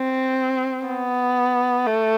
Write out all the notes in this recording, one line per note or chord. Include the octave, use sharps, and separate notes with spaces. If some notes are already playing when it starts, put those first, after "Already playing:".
Already playing: C4
B3
A3